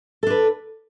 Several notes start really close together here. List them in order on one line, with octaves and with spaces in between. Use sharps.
A4 D4 B4